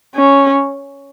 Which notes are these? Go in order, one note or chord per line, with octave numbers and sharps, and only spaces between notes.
C#4